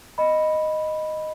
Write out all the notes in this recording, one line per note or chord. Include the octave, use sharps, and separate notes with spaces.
D#5 B5